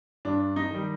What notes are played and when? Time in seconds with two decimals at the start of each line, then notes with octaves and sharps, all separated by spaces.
0.25 G2 D4
0.56 D#4
0.71 D#3 G3